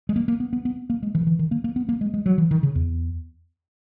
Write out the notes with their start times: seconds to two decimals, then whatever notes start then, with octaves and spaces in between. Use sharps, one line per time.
0.09 G#3
0.16 A#3
0.28 A#3
0.40 B3
0.53 B3
0.65 B3
0.90 A#3
1.03 G#3
1.15 E3
1.21 D#3
1.27 E3
1.39 D#3
1.51 A#3
1.64 A#3
1.76 B3
1.89 A#3
2.01 G#3
2.14 G#3
2.26 F#3
2.38 E3
2.51 D#3
2.63 C#3
2.75 E2